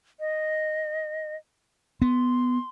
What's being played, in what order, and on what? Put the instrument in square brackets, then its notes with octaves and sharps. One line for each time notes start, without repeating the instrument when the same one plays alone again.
[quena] D#5
[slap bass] B3 [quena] C6